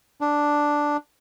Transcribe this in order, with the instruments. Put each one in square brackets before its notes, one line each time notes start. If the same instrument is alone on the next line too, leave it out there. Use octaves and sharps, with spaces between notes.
[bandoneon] D4